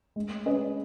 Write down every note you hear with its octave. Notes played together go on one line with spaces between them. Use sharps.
G#3
C#4 G#4 B4 D#5